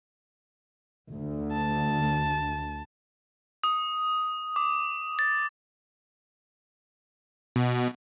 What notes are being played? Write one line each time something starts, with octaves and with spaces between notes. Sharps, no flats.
D2
A5
D#6
D6
A6
B2